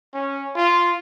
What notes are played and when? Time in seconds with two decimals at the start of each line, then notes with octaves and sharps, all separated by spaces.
0.14 C#4
0.55 F4